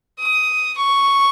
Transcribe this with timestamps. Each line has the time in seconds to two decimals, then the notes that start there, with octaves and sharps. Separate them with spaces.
0.20 D#6
0.78 C#6